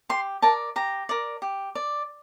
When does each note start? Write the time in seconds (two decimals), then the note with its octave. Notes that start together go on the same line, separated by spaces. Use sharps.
0.09 G4 C6
0.42 A#4 D5 A5
0.76 G4 A#5
1.09 A#4 D5
1.42 G4
1.75 D5